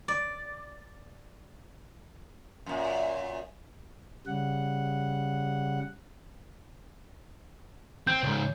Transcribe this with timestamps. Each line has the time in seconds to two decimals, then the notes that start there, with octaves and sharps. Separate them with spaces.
0.08 D5
2.66 F#2 A#2
4.26 C#3 G3 F#5
8.07 C4 G6
8.23 C#2 G#2